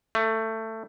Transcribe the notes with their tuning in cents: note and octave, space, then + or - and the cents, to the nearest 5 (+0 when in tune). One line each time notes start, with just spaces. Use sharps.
A3 +20